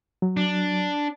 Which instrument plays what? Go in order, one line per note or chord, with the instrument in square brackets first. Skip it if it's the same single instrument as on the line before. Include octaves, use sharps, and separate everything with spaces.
[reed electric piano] F#3
[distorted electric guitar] D4